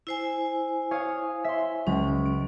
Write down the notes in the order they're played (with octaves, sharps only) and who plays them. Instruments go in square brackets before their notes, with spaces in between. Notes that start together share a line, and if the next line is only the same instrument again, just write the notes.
[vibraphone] E4 C5 G#5 [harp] E7
[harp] C#5 F5 D#6
E5 C6
[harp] C#2 F#3 [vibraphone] C#4
[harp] D7